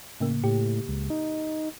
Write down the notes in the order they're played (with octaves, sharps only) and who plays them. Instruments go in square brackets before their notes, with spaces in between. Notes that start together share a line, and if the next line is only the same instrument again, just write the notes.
[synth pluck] A2 C#3 A#3
[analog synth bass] A2 [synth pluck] G4
[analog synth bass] C#2
D#4